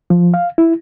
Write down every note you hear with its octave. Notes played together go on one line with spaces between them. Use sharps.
F3
F5
E4